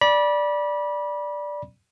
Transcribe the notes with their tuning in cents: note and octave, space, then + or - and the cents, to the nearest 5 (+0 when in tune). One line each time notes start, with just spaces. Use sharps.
D5 +0 B5 -30